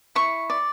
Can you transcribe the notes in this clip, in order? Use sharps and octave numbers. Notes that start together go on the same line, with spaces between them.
E4 C#6
D5